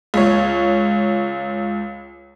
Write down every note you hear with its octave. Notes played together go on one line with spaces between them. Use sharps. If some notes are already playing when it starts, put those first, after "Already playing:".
C#2 C#5